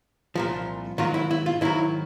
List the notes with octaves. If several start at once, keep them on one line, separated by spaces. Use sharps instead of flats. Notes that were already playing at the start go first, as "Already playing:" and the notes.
C2 A#2 F3
G#2 D#3 F#3 F4
E4
E4
F4
G#2 D#3 F#3 E4